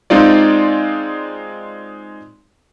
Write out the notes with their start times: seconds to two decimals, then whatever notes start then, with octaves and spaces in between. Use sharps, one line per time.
0.10 G#3 C4 D#4 F4 D5